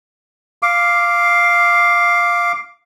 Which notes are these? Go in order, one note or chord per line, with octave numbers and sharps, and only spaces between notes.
F5 D6